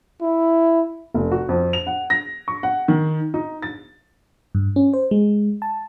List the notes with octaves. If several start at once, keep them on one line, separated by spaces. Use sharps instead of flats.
E4
F1
F#4
F2
F7
F#5
A#6
C#6
F#5
D#3
D#4
A6
G2
C#4
C5
G#3
A5